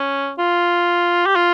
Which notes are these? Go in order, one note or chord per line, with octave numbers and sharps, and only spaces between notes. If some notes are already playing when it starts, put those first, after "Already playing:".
Already playing: C#4
F4
G4
F4